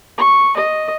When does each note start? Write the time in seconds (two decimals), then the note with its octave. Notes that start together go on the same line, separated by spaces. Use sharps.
0.18 C#6
0.57 D#5